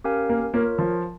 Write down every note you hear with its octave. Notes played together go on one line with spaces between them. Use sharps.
C#4 G4 A#4 F5 G#5
A#3
A#3 F4 A#4 C#5
F3